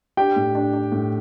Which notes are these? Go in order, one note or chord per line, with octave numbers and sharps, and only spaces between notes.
D4 G4 G5
A2
D4
D4
A2